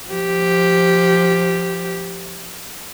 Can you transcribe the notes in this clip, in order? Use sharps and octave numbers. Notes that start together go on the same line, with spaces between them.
F3 G4